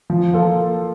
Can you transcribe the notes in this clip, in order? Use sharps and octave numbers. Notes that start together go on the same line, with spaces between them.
F3
A#3 F4 A4